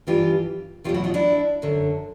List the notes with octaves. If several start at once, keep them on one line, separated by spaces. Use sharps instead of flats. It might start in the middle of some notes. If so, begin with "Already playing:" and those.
G2 E3 F4 G4
E2 B2 F#3 F4 G4
E4 F#4
D#4 F4
D4 E4
F#2 D3 F#3